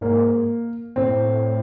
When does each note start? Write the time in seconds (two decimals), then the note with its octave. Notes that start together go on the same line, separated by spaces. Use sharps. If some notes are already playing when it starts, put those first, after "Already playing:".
0.01 G#2 A#3
0.96 A2 C4